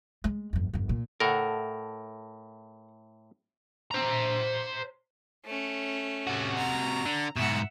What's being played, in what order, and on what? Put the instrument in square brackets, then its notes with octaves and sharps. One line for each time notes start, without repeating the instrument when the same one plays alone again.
[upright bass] G#3
G1 F2
G1 F2
A#2
[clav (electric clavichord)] A2 A#4 [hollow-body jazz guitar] A4 F#5
[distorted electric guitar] C5 A#5
[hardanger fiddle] A3 C#4
[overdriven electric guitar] C3 F#4
[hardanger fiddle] A#5
[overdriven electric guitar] D3
[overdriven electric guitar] G#2 B2 [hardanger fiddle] E5 F#5